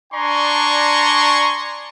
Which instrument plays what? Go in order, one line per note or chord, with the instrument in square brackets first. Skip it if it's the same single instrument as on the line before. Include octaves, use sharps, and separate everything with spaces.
[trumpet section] D4 D5 G#5 A#5 C6 C#6